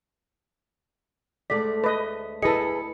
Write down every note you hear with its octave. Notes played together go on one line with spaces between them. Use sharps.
D2 G#3 A3 D5 B6
B4 D#5
E4 G#4 A4 B4 D#5 C#7